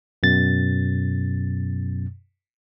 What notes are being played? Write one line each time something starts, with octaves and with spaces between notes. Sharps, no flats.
F#2 B2 A6